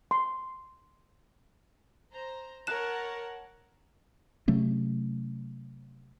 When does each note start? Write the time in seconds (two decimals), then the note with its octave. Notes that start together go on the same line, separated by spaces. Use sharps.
0.11 C6
2.13 C5 A#5
2.67 A#4 C#5 F#5 A5 F#6 E7
4.48 C3 F#3 A3 C#4